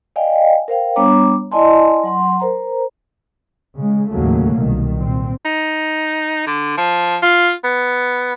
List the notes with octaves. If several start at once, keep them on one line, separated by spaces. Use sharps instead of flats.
D5 D#5 F5 G5 G#5
A#4 C5 F5 G5
G3 B3 D4 C#5 A#5 D6
E4 D5 D#5 G#5 A5 C6
F#3 F#5 C6
A#4 C5 A#5
C#3 G#3
D#2 A2 C#3 F#3 A3 A#3
C2 B2 D#3
A#2 C4
D#4
D3
F3
F4
B3